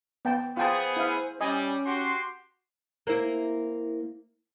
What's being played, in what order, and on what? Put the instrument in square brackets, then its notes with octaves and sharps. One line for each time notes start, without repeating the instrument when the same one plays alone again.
[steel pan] B3 G5 A5
[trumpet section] B3 G#4 [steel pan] F4 G5 A5 [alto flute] C5
[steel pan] E4 F5
[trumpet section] G3 [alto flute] C#4 [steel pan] D#5 G#5
[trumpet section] F#4 G4 C6
[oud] A#3 C4 E4